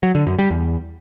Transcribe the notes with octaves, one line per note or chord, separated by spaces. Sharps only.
F#3
D3
F#2
G3
E2